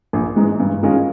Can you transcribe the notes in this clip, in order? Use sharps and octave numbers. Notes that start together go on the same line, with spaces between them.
A#1
G#2 E3 G#3
G2
D#3 G#3 C#4 F4